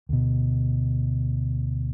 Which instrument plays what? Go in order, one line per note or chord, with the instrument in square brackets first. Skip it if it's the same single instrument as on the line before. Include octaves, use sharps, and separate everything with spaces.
[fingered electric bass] D2 B2